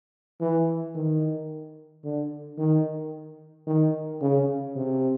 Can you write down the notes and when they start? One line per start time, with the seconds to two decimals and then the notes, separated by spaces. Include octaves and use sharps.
0.41 E3
0.95 D#3
2.05 D3
2.58 D#3
3.67 D#3
4.21 C#3
4.76 C3